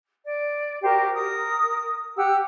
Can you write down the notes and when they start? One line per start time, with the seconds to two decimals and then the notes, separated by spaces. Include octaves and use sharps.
0.24 D5
0.82 F#4 G4 A#4 C5
1.13 A#4 D#6
2.15 G4 F#5 E6